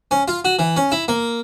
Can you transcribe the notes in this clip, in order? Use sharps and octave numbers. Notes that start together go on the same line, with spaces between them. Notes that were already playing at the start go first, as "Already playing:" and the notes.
C#4
F4
F#4
E3
C#4
E4
A#3